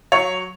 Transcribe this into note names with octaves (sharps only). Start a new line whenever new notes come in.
F#3 C#5